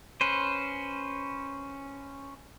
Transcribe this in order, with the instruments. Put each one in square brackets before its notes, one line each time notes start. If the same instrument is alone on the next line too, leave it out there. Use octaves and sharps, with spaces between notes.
[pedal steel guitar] C#4 B4 C5